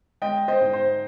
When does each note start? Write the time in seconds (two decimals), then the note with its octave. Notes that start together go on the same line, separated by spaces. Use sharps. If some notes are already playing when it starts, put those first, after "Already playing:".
0.21 G#3 D#5 G5
0.48 C5 D#5
0.61 G#2
0.73 C5